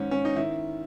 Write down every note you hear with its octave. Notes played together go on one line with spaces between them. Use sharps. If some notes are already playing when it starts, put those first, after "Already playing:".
Already playing: G#2 D#3 C#4
C#4
D#4
D#3 E4